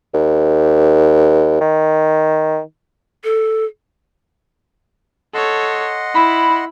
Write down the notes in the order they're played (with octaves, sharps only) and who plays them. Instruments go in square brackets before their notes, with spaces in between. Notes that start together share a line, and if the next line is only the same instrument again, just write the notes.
[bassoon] D#2
D#3
[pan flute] A4
[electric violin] A4 C#5 [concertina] D#5 F#5 C6
[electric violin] E4 [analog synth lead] B5